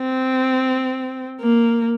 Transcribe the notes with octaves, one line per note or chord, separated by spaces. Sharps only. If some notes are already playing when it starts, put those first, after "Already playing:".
Already playing: C4
A#3